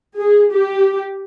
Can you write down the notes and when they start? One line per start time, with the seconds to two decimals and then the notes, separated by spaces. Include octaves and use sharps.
0.19 G#4
0.52 G4